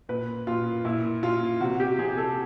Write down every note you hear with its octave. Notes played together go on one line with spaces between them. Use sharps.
A#2 B4
A#2 F4
A#2 E4
A#2 F4
C3 F#4
G4
C3 G#4
A4